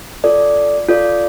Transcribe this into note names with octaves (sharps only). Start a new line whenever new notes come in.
F4 A4 D5
F4 A4 D5